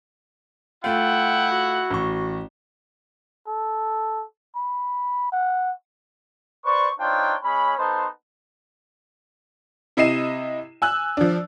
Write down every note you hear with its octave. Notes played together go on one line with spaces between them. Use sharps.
A3 E4 F4 F#5 G5
F#4
A1 C#6
A4
B5
F#5
B4 C5 D5 C#6
D4 D#4 F4 C5 C#5 G5
G#3 C#4 C#5 B5
B3 D#4 A4 C5
C3 E4 D#5 C7 D#7 E7
G#5 E6 F#6
F3 D4